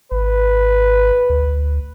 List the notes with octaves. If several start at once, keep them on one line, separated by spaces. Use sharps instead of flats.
G#1 B4
D2